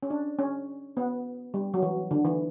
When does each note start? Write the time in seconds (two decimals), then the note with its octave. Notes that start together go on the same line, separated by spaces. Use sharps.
0.03 C#4
0.10 D4
0.39 C#4
0.97 B3
1.54 G3
1.74 F#3
1.82 E3
2.11 D3
2.25 E3